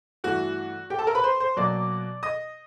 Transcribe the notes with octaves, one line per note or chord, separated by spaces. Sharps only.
G2 E3 A3 F#4 F#5
G4 G5
A4 A5
A#4 A#5
B4 B5
C5 C6
C5 C6
B2 F#3 A#3 D5 D6
D#5 D#6